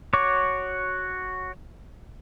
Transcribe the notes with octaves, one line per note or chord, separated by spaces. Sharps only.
F#4 C#5 C#6 D6